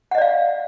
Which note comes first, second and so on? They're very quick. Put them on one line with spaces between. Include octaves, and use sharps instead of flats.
F#5 D#5 D5 F5